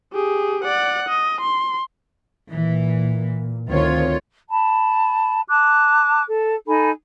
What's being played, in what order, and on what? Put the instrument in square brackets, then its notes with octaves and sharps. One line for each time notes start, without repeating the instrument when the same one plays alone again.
[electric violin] G4 G#4
D5 F#5
D#5
C6
[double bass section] A#2 [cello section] E3
[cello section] D2 F4 C#5 [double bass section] D#3 C4
[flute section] A5 B5
A5 D6 F#6
A4
D#4 A4 G#5 B5